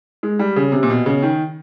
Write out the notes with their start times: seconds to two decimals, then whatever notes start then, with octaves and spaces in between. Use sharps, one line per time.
0.23 G#3
0.39 G3
0.56 C#3
0.72 C3
0.83 A#2
0.90 B2
1.06 C#3
1.22 D#3